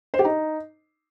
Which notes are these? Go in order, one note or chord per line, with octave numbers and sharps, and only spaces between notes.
C5
G4
D#4